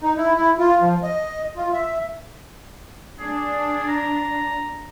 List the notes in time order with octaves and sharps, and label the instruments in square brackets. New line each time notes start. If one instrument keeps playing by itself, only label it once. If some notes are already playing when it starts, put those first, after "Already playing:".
[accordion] D#4
E4
E4
F4
F3
D#5
F4
E5
[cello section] D4 [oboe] G#4
[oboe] A#5